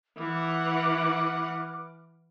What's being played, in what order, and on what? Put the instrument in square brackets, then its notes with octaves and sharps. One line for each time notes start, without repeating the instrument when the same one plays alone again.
[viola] E3 F#5 [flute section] B4 D6 F6